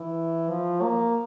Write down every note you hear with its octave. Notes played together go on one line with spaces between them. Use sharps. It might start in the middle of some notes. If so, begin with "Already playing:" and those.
Already playing: E3
F3
A#3